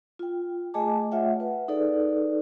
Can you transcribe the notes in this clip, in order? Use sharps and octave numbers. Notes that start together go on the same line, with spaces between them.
F4 G5
A3 G#4 D#5 G#5 A5 D6
A3 F4 C#5 E5 F#5 G5
B4 F#5
D#4 G#4 A4 B4 D5